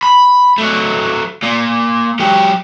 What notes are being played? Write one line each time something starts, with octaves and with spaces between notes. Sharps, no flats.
B5
F#3 A3
A#2
F#3 G4